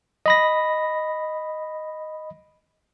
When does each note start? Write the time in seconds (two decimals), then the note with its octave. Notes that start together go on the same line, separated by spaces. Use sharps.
0.26 D#5 B5 A#6